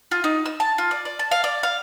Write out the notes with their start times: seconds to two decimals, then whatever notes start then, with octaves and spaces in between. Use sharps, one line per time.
0.11 F4
0.24 D#4
0.46 E6
0.60 A5
0.78 F4
0.91 D5
1.05 D5
1.19 A5
1.31 F5
1.44 D5
1.63 F5